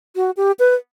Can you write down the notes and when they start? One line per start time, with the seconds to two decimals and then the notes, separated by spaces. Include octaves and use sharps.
0.16 F#4
0.37 G4
0.59 B4